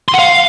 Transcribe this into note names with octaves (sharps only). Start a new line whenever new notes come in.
C6
F#5
F5